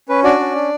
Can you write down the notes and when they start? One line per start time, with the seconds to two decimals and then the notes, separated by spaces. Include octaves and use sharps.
0.09 C#4 B4
0.24 D4 F#4 D5
0.40 C#4
0.55 D4